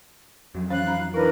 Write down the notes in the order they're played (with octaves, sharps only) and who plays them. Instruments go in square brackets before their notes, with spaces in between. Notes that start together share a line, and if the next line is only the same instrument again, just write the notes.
[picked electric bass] F2 F#3
[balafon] E3 C#4 C5 [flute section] F5 F#6
[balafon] D#4 A#5 B5
[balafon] E3 E4 [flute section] D4 A#4 B4